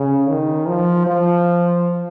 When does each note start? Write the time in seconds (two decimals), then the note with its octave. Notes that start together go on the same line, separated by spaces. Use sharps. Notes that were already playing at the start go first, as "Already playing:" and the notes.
Already playing: C#3
0.29 D#3
0.68 F3
1.06 F3